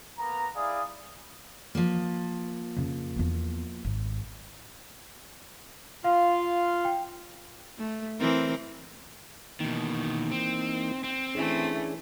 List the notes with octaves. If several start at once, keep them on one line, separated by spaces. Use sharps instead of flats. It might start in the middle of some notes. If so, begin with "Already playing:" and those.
A#3 B3 A#5
E4 G#4 D5 F5 D#6
F3 A#3
F2 C#3
E2 B3
G#1
F4 F5
G5
A3
E3 C4 A#4
B2 D#3 E3 A#3 D#4
C4
C4
E3 A3 C#4 D4 G#4